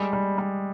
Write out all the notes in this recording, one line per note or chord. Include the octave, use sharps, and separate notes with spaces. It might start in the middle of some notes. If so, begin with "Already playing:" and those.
Already playing: G3 G#3
G3
G3